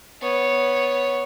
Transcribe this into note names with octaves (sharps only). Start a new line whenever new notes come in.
B3 C#5